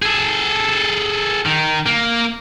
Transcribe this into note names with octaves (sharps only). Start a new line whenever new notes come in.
G#4 A4
D#3
A#3